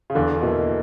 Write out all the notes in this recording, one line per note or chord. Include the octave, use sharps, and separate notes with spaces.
C#3
E2 D3
B2 A#3 E4